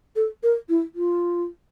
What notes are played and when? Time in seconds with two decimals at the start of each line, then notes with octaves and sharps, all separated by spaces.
0.16 A4
0.43 A#4
0.69 E4
0.95 F4